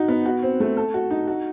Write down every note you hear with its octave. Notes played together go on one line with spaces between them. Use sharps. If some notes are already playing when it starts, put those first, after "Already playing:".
Already playing: D#4 F#4
B3
F#4
C4
A3
A4
F#4
D#4
F#4